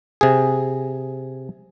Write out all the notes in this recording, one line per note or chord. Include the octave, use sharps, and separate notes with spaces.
C3 G#4